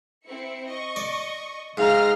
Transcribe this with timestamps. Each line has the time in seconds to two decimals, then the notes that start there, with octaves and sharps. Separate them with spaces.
0.25 C4 E4 C#7
0.65 D#5 C#6
0.96 D5
1.77 G#2 D#4 F5 C6 F6 A#6